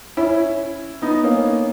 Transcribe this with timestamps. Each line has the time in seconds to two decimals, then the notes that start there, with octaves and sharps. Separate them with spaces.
0.17 C#4 E4
1.02 B3 D#4
1.24 A#3 C#4